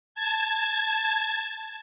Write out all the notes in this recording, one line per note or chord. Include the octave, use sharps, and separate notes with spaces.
A5 G#6